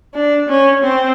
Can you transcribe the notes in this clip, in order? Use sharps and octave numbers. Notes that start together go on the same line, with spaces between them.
D4
C#4
C4